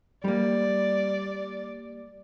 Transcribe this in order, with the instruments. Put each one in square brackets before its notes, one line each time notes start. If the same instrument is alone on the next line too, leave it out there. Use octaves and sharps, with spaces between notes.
[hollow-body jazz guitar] G3 A#3 [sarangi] D5